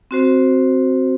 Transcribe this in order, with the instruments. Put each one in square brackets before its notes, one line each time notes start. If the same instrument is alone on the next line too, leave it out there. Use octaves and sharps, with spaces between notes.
[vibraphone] C4 F#4 C5